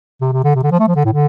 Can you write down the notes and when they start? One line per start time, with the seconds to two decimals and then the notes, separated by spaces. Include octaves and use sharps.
0.21 C3
0.32 C3
0.44 D3
0.55 C3
0.63 D3
0.71 F3
0.80 A3
0.88 F3
0.96 D3
1.05 A2
1.12 D3